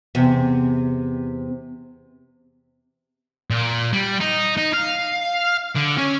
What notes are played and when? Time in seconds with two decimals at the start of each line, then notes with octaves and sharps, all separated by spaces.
0.15 E2 C3
3.50 A#2
3.93 G3
4.20 D#4
4.57 D#4
4.73 F5
5.75 D3
5.98 C#4